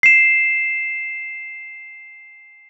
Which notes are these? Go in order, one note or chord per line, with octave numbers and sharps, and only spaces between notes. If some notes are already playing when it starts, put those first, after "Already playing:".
C7 E7